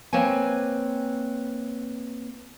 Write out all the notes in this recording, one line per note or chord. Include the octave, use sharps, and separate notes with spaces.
A#3 C4 B4 C#5 G#5